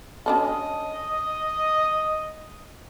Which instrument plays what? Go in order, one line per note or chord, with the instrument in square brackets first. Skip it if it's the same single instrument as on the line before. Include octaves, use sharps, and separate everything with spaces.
[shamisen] C#4 D4 A4 [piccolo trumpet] D#5